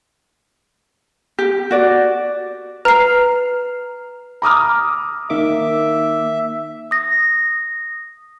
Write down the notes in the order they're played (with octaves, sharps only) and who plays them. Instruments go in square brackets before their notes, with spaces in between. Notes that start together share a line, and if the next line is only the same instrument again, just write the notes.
[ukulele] G4
F#4 D5
[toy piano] B4 [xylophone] A#5 C7
[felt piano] A#5 D6 D#6 F6
[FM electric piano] D#3 A#3 D6 [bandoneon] E5
[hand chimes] D#6 A#6